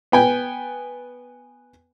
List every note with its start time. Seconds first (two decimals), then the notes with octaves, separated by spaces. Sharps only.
0.12 B3 G5 G#5